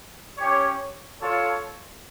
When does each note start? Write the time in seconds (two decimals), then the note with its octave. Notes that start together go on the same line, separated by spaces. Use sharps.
0.38 C#4 G4 C#5
1.20 F4 A4 C#5